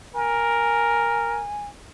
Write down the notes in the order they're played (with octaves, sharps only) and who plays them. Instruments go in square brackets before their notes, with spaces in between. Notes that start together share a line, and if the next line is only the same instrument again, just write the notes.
[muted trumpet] A#4 [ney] G#5